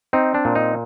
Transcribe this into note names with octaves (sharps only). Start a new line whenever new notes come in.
C4 D#4
D4
A#2
D#4